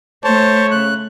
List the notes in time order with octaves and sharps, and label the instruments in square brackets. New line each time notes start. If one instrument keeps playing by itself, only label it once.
[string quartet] A3 [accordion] C5 A5 [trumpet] C#5
[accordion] C#3 F#6